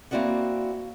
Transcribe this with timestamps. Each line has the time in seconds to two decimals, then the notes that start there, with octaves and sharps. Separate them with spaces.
0.11 A#3 C4 E4 F#4 D5 F#5